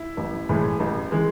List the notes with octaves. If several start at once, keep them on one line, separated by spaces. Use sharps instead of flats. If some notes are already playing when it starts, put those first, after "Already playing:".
Already playing: E4
A1
A2 E3 G#3
A1
E3 G#3